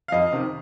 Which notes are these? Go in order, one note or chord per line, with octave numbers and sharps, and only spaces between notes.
F5
F2 D#5
C3 D#3